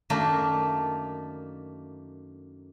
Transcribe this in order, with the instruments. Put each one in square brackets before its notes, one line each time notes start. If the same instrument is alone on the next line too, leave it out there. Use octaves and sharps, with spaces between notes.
[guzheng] F#2 D#3 A3 A#3 D4